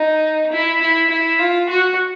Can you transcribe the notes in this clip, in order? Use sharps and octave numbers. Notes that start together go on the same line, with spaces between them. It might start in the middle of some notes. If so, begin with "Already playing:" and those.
Already playing: D#4
E4
E4
E4
F4
F#4